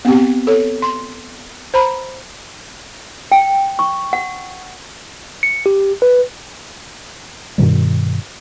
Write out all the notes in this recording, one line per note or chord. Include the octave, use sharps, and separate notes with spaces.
B3 C4 G4
A4 C#5
C6
C5 A#5 B5
G5
C#6
F#5
C#7
G4
B4
G2 B2 D#3 G3